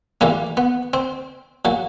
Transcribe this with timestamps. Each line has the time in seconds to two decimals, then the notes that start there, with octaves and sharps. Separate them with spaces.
0.21 A2 E3 G3 A#3
0.57 B3
0.93 C4
1.65 A#2 F#3